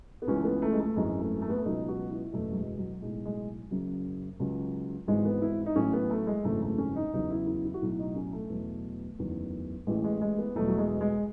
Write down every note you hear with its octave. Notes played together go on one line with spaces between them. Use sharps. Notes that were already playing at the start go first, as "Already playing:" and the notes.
B3
C#2 C#3 E3 C#4
A3
B3
A3
G#3
A3
G#1 F#2 E3 G#3
A3
A3
B3
A3
C#2 B2 F#3 D#4
F#4
E4
F#1 E2 B2 F#3 A3
F#3
G#3
F#3
B1 A2 F#3 G#3
G#3
F#1 F#2 C#3 F#3
C#2 C#3 F#3
G#1 G#2 E3 G#3
B3
E4
D#4
A1 A2 F#3 C#4
B3
A3
G#3
G#1 F#2 C#3 E3 A3
A3
C#4
D#4
E2 C#3 F#3 D#4
E4
E4
E4
F#4
B1 A2 F#3 E4
D#4
C#4
A3
E2 B2 F#3
F#1 E2 D#3 F#3
A1 A2 E3 G#3
G#3
G#3
B3
E2 B2 F#3 A3
F#3
G#3
G#3